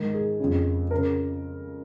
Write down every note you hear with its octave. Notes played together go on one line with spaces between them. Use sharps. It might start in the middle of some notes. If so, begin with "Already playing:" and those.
Already playing: G#2 D#3 A#4
G#4
F2 C#3
C#3 A#4